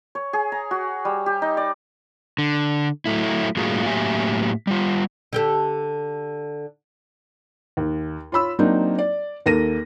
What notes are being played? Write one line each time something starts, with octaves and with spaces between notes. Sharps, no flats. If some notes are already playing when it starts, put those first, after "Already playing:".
C#5
G#4
A#5
F#4
G3
G4
D#4
D5
D3
F#3 A3 E4
A2 G3 A#3 F4 F#4 G#4
A2 F#3 A#3 G4 E5 G#5
G3 F4
D3 G4 A4
D#2
F4 C#5 B5 E6
F#3 A#3 C4 D4 D#4
D5
D#2 A#3 A4 A#6 D#7